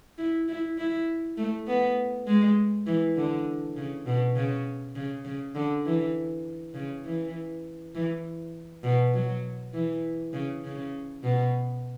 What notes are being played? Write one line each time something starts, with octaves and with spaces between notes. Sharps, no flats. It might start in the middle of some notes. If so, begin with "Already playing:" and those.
E4
E4
E4
A3
B3
G#3
E3
D3
C#3
B2
C#3
C#3
C#3
D3
E3
C#3
E3
E3
B2
F#3
E3
C#3
C#3
B2